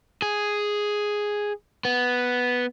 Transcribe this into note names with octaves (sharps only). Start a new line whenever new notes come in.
G#4
B3